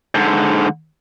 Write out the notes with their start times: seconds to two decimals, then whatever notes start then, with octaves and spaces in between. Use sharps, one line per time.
0.15 G#2 D3